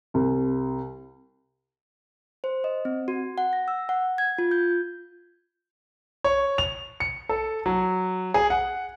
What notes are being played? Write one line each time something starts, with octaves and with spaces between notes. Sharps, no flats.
C2
C5
D#5
C4
F#4
F#5
A#6
E6
F#5
G#6
F4
G6
C#5
F7
C#7
A4
F#3
G#4
F#5